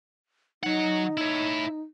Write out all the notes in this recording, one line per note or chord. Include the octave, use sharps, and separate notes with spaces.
F#3 D#4 F#5
E4 C#5